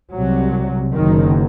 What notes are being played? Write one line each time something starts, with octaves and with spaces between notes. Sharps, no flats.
C2 C3 F#3
F#1 F#2 D#3